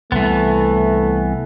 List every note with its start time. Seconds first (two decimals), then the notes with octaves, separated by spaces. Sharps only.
0.12 C2 E3 A3 B3